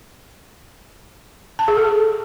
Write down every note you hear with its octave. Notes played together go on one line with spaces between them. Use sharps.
A5
G#4
A4